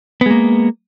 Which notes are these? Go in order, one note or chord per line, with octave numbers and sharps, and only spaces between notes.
G#3 A#3 B3